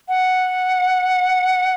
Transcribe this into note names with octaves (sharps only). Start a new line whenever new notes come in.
F#5